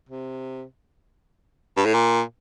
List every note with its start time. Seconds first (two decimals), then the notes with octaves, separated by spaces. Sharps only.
0.09 C3
1.77 G2
1.86 A2
1.94 A#2